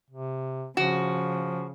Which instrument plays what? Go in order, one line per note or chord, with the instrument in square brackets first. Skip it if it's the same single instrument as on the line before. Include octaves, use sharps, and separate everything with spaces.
[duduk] C3
[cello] C#3 [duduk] F3 [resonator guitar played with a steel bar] F#4